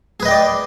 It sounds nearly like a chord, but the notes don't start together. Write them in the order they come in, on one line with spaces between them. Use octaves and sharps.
G#4 B4 D#5 G5 D5